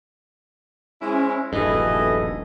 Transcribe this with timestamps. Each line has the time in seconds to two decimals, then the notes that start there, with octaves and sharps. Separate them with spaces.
1.01 G#3 C4 C#4 E4
1.53 D#1 A#1 G2 B2 E3 E4 A4 D#5